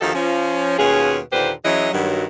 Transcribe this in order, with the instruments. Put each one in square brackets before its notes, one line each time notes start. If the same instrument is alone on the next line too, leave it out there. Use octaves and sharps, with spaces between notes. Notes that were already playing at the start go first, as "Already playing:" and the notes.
[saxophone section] D2 D#3 F3 D#4 G4 A4
F3 C#4
D#2 B2 C#4 F4 G#4
D#2 A#2 D3 G4 B4 C5
E3 F#3 C#4 E4 G#4 D#5
G2 D#3 F#3